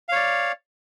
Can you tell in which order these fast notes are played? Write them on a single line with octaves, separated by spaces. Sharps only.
F5 C#5 D5